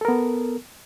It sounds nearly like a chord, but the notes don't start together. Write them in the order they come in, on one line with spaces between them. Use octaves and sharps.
A4 A#4 B3